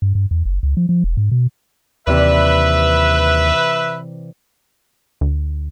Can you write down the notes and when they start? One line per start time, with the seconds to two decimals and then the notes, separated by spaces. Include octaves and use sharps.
0.02 G2
0.15 G2
0.31 E2
0.45 F#1
0.63 C#2
0.77 F3
0.89 F3
1.04 E1
1.17 G#2
1.32 B2
2.07 D#2 C3 E3 B4 D5 E5
5.21 D2